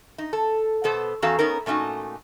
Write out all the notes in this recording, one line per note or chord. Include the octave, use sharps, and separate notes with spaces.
D#4
A4
B2 B3 A4 C5
E2 C#4 F#4 A4 F5 A#5
B3 C#4 D#4 A#4
A#2 A3 C#4 D#4 F#4